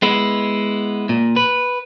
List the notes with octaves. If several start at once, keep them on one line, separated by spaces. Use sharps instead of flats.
G#3 B3 E4
A#2
B4